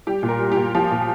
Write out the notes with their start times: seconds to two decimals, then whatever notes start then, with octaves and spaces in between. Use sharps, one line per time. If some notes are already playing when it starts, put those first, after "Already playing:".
0.07 G3 G4
0.23 A#2
0.29 A#4
0.40 G3
0.52 G4
0.57 A#2
0.75 F3 G4
0.91 A#2